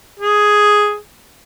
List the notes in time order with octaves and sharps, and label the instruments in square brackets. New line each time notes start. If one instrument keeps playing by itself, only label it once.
[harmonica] G#4